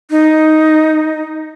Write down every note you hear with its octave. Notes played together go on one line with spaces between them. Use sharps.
D#4